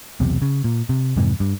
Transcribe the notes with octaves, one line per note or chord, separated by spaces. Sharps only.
B1 E2 C3
C#3
A#2
C3
F2 G#2 C3 E3
G2